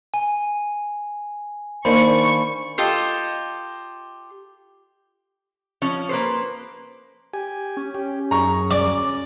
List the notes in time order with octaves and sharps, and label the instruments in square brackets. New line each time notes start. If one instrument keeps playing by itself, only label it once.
[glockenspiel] G#5
[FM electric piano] D#3 C5 [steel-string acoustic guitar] A#3 D4 [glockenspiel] B5 [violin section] C#6
[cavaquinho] F4 G4 A4 D#5
[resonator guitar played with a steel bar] F3 C#4
A#3 B4 C5
[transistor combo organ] G4 G#5
[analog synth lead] C#4
[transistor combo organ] G4
[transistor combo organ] F#2 G#4 [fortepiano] A#5 C#6
[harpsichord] D5